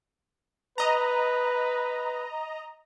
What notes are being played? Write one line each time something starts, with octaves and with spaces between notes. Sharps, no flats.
B4 D#5 A#5